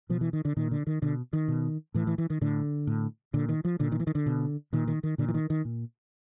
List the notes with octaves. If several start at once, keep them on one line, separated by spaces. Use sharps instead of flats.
B2 F3
E3
D#3
D3
A#2 D#3
D3
D#3
B2 D3
D#3
B2
A2 E3
E3
E3
D#3
A2 D3
A2
A#2 D3
D#3
F3
A#2 D3
D#3
E3
D#3
D3
B2
A#2 D#3
D#3
D#3
A#2 D3
E3
D#3
D#3
A#2